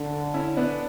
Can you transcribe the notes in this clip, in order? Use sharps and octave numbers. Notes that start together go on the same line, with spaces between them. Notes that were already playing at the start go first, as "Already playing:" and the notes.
Already playing: D3 D4
C#4 E4
B3 D4